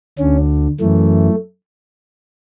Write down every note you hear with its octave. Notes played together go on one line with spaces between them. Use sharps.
D2 D3 C#4
F#2 E3 A3